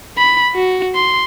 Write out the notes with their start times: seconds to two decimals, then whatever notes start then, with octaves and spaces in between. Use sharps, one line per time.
0.18 B5
0.55 F#4
0.95 C6